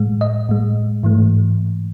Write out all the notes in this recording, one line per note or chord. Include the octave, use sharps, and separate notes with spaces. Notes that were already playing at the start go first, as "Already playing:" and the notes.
Already playing: A2 G#3
D#5
A2 G#3
G#2 E3 A3